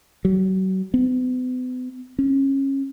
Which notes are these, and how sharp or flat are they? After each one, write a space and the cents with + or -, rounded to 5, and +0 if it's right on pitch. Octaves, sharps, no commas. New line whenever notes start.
F#3 +35
B3 +40
C#4 -25